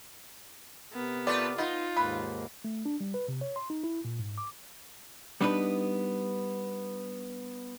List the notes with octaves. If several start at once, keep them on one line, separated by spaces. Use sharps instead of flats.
C3 B3 A#4
A3 F4 B4 D5
B3 D#4 F4
D#2 G#2 A#3 B4
A3
D4
G3
B4
C3
C#5
C6
D#4
E4
A#2
G#2
D6
G3 B3 D4 D#4 B4